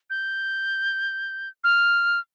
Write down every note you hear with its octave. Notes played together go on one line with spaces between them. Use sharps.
G6
F6